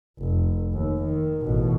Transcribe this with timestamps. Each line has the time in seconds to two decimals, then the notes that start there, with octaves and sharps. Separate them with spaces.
0.19 F1
0.72 D#2
1.03 D#3
1.45 A1 B2